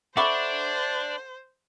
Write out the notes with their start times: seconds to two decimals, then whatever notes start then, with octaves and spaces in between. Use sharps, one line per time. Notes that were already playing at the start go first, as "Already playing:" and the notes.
0.17 D4 A4 C5 E5 F#5 B5 C#6 D6